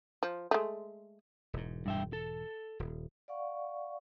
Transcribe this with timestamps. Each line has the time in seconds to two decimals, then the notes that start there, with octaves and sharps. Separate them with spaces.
0.23 F3
0.51 G#3 A3
1.53 E1 G#2
1.86 G2 E5 G5
2.13 A4
2.79 D#1
3.28 D5 F5 F#5 C#6